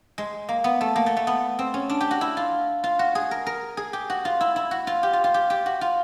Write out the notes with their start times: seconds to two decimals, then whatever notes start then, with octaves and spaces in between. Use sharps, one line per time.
0.18 G#3
0.49 A#3
0.64 B3
0.81 A3
0.96 A#3
1.06 A3
1.17 A3
1.27 B3
1.59 C4
1.74 C#4
1.90 D4
2.01 G4
2.11 F#4
2.21 E4
2.37 F4
2.84 F4
2.99 F#4
3.15 G#4
3.31 A#4
3.46 A#4
3.77 G#4
3.93 G4
4.10 F#4
4.25 F4
4.41 E4
4.56 E4
4.71 F#4
4.87 F4
5.03 G4
5.13 F4
5.24 F4
5.34 G4
5.50 G4
5.66 F#4
5.81 F4